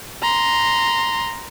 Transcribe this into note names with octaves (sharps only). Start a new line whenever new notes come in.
A#5 C6